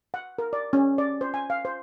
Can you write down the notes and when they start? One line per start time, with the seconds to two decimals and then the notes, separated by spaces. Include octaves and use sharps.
0.14 F#5
0.38 A#4
0.53 D5
0.73 C#4
0.98 D5
1.21 C5
1.34 G#5
1.50 F5
1.65 C5